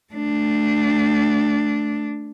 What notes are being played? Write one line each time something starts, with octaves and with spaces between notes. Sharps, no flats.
A3 D4